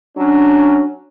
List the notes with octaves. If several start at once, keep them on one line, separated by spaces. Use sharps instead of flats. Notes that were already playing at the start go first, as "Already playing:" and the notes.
F#3 C#4 D4